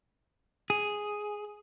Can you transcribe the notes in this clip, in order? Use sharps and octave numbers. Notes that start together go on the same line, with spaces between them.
G#4